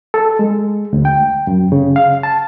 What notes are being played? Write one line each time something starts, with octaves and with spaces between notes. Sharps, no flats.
A4
G#3
D2
G5
F#2
C#3
F5
A5